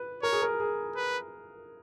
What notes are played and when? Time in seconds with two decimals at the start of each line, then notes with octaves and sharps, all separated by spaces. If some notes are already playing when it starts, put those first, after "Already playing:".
Already playing: B4
0.22 A#4 C#5
0.32 G#4
0.42 A#4
0.60 G#4
0.96 B4